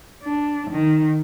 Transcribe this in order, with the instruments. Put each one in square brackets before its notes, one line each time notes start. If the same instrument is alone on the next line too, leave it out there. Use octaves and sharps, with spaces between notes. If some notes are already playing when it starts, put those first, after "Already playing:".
[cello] D4
D#3